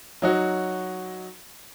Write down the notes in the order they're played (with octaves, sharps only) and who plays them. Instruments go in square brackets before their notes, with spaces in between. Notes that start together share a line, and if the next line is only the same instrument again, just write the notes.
[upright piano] F#3 D#4 F#4 C#5